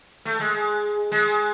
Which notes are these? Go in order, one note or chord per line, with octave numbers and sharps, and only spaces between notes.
A3
G#3
G#3